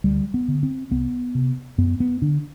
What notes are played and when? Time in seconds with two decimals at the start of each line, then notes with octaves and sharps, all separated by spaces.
0.04 D2 G3
0.34 B3
0.48 D3
0.63 C4
0.91 C2 B3
1.35 C3
1.78 F#2 B3
2.00 B3
2.22 D3 D4